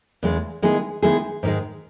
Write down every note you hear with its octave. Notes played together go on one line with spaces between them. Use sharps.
E2 C#3 G#3
D#3 G#3 B3 E4 G#4
D#3 G#3 B3 E4 G#4
G#2 D#3 G#3